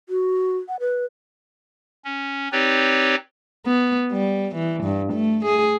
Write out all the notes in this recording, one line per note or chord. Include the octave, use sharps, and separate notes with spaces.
F#4
F#5
B4
C#4
C4 D#4 G4 B4 C#5 D5
B3
G3
E3
G2
A3
G#4